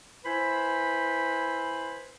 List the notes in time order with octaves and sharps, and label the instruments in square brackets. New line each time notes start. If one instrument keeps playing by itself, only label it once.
[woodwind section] E4 B4 C5 G#5 B5